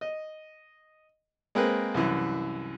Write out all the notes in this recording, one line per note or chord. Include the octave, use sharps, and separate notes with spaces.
D#5
G#3 A#3 C4 B4
C2 F#2 E3